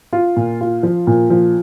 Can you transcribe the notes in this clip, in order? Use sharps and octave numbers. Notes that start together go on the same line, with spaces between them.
F4
A#2
F4
F3
A#2
F3